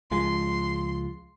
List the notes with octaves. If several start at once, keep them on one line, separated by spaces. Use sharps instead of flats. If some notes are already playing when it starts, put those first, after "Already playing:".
C#2 F3 G#3 C6